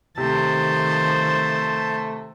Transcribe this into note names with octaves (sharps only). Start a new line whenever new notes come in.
C3 D#3 F3 A3 C5 A5